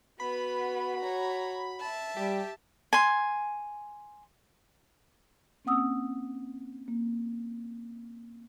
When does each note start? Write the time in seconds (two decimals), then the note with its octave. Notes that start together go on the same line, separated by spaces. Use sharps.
0.20 B3 F#4 B4 B5
1.01 C#5 A#5
1.80 E5 A5
2.17 G3 G4
2.93 G#5 C6
5.65 A#3 C4 C#4 F#5 D#6 E6
6.88 A#3